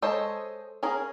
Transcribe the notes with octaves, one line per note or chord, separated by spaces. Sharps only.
G#3 A4 C5 C#5 D#5
C#4 G#4 A#4